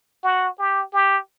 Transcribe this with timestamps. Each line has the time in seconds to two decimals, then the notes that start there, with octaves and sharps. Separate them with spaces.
0.24 F#4
0.59 G4
0.93 G4